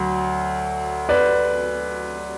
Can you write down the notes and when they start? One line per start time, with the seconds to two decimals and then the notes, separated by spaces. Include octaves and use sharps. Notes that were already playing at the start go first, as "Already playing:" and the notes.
Already playing: D2 F#3
1.09 B4 D5